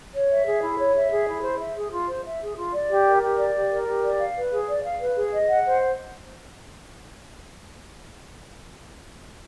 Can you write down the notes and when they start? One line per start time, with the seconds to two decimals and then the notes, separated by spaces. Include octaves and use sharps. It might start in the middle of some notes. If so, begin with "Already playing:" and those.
0.14 C#5
0.30 E5
0.46 G#4
0.62 E4
0.79 C#5
0.95 E5
1.11 G#4
1.28 E4
1.44 C5
1.60 E5
1.76 G#4
1.92 F4
2.08 C5
2.25 E5
2.41 G#4
2.57 F4
2.73 D5
2.90 G4
3.06 A#4
3.22 G4
3.38 D5
3.55 G4
3.71 A#4
3.87 G4
4.03 D5
4.19 F5
4.36 B4
4.52 G#4
4.68 D5
4.85 F5
5.00 B4
5.17 G#4
5.32 D#5
5.49 F#5
5.66 C5